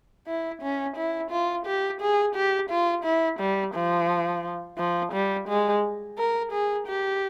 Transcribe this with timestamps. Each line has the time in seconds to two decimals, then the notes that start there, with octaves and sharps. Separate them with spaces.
0.28 E4
0.62 C#4
0.97 E4
1.31 F4
1.66 G4
2.01 G#4
2.35 G4
2.70 F4
3.04 E4
3.40 G3
3.75 F3
4.78 F3
5.13 G3
5.48 G#3
6.18 A#4
6.52 G#4
6.87 G4